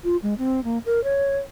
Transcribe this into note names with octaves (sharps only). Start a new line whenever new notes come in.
F4
G#3
C4
A#3
A#4
C#5